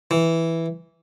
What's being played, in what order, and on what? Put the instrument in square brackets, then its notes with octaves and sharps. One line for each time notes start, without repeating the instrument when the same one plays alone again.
[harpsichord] E3